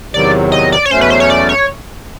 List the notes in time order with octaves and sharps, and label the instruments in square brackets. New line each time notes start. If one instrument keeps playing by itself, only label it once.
[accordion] E2 C3 D#3 F#3 [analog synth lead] D5
[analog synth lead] D#5
D5
C#5
[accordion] E2 B2 F#3 A3 C#4 [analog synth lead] C5
[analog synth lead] B4
C5
C#5
D5
C#5